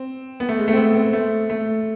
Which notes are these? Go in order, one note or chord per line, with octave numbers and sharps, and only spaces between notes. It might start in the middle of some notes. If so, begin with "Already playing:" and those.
Already playing: C4
B3
A3
G#3
A3
C4
B3
C4
A3
A3